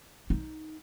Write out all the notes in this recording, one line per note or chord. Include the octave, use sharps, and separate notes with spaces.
D#4